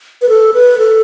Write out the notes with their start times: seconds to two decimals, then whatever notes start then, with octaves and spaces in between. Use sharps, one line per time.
0.22 B4
0.29 A4
0.54 B4
0.78 A4